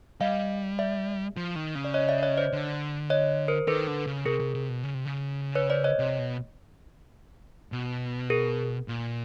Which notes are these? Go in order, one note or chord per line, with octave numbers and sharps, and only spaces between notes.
G3 D#5 F5
D5 E5
F3
D#3
C#3
D5
C#5 D#5
D5 E5
C#5 D#5
C5 D5
D3
C#5 D#5
A#4 C5
D#3 A4 B4
D3
C#3
C3 G#4 A#4
C3
C3
B2
C#3
C3
C#3
B4 C#5
C5 D5
C#5 D#5
C3
B2
B2
G#4 A#4
A#2